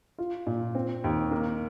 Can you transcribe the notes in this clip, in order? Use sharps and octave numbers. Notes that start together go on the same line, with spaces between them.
F4
A#2
C4
D#2
A#3